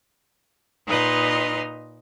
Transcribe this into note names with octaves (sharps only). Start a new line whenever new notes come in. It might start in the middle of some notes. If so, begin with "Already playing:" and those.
A#2 D#4 B4 D#5 C6 F6